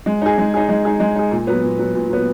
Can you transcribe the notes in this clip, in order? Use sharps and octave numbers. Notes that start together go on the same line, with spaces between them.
G#3
D#4 G#4
G#3
D#4 G#4
G#3
D#4 G#4
G#3
D#4 G#4
A#2
F#3 B3
A#2
F#3 B3
A#2
F#3 B3